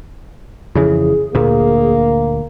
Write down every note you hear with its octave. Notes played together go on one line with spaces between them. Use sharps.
F2 C#3 E3 G#4
D2 A#2 A#3